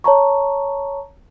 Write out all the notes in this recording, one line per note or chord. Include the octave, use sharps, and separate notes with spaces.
C#5 A5 A#5 C#6